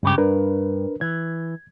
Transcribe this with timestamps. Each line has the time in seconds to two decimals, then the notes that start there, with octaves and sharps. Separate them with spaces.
0.03 C#2 G2 C#3 G4
0.18 G2 D4 A#4 B4
1.01 E3 G#6